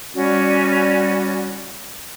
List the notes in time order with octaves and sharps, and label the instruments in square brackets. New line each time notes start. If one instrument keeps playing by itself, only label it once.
[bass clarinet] G3 [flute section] C#4 F#4 D5